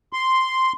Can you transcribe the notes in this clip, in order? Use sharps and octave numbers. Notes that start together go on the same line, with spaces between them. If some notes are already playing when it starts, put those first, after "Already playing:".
C6